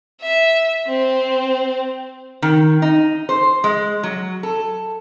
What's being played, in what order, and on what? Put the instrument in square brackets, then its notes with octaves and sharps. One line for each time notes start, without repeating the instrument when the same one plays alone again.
[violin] E5
C4
[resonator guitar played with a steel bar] D#3
D#4
C5
G#3
F#3
A4